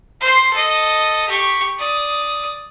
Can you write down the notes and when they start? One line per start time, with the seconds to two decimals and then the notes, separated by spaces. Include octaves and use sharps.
0.21 C5 C6
0.53 A4 D#5
1.28 G4 C#6
1.78 D5 D#6